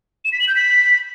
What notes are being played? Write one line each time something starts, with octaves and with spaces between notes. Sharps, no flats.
E7
B6
F#7
G6
B6